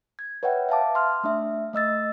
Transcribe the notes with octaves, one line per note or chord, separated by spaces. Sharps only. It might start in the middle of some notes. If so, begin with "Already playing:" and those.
G#6
B4 C#5 E5 F#5 G5
E5 F5 A5 D6
C6 F6
A3 D4 E5
A3 D#5 E6 A6